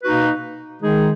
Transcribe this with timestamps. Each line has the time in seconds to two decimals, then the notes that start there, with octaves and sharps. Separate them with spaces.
0.04 B2 A#3 D#4 F#4 B4
0.82 D#3 G#3 D#4 G#4